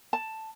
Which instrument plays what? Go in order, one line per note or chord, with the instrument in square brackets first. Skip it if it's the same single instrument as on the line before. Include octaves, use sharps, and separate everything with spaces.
[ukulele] A5